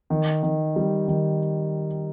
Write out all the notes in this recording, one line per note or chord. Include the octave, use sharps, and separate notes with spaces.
D#3
D#3
G3
D#3